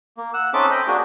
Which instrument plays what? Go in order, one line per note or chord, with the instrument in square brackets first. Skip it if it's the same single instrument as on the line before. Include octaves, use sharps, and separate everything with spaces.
[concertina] A#3
F#5 E6
C4 C#4 D#4 A4 E5 D6
D#5 G5 B5
A#3 D4 F#4 G#4